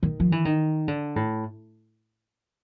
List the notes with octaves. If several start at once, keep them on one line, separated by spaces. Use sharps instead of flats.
D#3
F3
E3
D#3
D3
A2